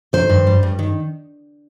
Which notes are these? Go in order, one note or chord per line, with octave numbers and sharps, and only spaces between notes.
D#3 C5
G2
G3
G2
D#3